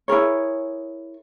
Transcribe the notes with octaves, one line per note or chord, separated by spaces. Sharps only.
E4 G#4 A#4 C#5